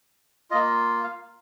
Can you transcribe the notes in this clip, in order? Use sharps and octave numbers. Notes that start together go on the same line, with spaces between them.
A#3 F4 D#5
F5